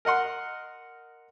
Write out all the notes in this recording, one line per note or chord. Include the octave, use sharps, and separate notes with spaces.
A#4 D#5 F#5 C6